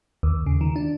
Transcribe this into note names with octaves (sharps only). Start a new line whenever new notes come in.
D#2
C#3
D#3
D4